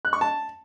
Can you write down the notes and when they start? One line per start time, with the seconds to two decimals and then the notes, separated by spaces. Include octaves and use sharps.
0.05 F#6
0.13 C#6
0.21 A5